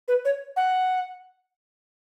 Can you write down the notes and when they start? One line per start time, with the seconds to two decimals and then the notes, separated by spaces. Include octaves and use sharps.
0.08 B4
0.25 C#5
0.56 F#5